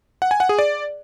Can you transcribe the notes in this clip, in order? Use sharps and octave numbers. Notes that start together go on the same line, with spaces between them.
F#5
G#5
F#5
G#4
D5